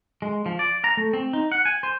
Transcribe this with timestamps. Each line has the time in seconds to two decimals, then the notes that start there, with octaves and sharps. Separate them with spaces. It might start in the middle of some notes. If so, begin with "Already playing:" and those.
0.22 G#3
0.46 F3
0.59 D5
0.84 A#5
0.97 A3
1.13 C4
1.33 D#4
1.52 F#5
1.65 G#5
1.83 C5